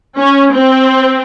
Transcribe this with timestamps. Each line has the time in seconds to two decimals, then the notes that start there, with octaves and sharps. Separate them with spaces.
0.18 C#4
0.53 C4